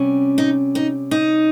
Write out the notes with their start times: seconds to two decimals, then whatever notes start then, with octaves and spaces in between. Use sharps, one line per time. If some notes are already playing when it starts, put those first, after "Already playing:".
Already playing: C3 G3 C#4
0.38 D#4
0.75 D#4
1.11 D#4